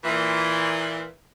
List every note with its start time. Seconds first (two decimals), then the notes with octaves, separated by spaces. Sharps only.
0.04 A#2 E3